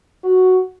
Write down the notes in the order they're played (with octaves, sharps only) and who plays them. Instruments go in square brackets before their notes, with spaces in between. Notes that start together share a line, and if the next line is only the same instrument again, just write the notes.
[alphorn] F#4